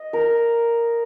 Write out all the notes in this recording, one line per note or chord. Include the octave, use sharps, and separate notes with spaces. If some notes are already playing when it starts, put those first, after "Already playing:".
Already playing: D#5
A#4